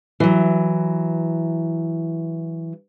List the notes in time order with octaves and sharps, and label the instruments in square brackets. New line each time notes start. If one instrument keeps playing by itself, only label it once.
[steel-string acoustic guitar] E3 F#3